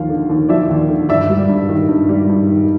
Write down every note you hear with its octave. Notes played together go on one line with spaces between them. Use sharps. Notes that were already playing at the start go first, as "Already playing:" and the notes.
Already playing: D#2 F3 F5
D3
D#2
F3 D5 E5
D#2
D3
G2 D5 E5
G3
G2
D#3
G2
G3
G2
D#3